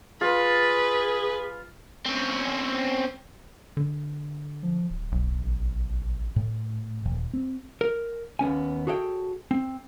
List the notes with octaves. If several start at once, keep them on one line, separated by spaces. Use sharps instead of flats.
F4 G#4 B4
C4 C#4
D3
F3
D1
B1
A1
A2
D#1
C4
A#4
D#2 B3 C#4 G#5
F#4 G#4 A4 C#5 F5 G5
C4